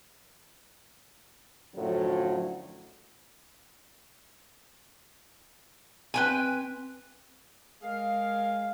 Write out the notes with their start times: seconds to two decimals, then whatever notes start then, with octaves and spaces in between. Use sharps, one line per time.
1.75 F#2 A2 D3 F3 F#3
6.14 C4 B4 G5 G#5
7.82 G#3 G#4 A#4 F5